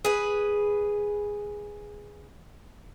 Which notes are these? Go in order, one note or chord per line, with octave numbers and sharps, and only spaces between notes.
G#4 B4